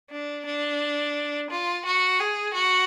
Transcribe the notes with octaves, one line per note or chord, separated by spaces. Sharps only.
D4
D4
F4
F#4
G#4
F#4